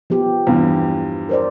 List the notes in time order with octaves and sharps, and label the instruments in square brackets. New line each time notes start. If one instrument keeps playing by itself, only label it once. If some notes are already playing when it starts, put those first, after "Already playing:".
[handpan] F3 B3 G4
[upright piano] E2 G2
[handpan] A#4 C5 D5